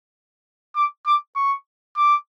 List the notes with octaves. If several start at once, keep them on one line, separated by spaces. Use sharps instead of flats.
D6
D6
C#6
D6